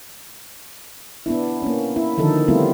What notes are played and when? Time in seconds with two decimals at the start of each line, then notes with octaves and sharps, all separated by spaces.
1.26 B3 D4 E4
1.62 A#3 C#4
1.96 E4
2.18 D3 D#3 F3 D#4 A4
2.48 G3 A3 B3 C4 E4 F4